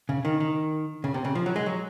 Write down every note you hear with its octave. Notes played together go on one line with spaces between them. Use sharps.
C#3
D#3
D#3
C#3
C3
C#3
F3
F#3
G#3
F#3